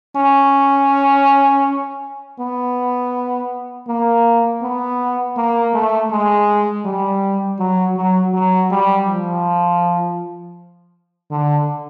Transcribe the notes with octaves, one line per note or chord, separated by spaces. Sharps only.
C#4
B3
A#3
B3
A#3
A3
G#3
G3
F#3
F#3
F#3
G3
F3
D3